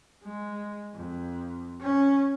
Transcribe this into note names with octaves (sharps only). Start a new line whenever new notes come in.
G#3
F2
C#4